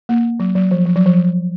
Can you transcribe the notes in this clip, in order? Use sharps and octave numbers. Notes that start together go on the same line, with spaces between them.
A#3
F#3
F#3
F3
F3
F#3
F3